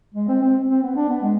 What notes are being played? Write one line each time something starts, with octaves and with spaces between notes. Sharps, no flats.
G#3
C4
C4
C4
B3
D4
B3
G#3